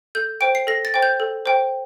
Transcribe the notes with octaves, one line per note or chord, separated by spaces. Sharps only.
A4 G6
C5 G5 D7
C7
A4 A#6
A6
C5 G5
G6
A4
C5 G5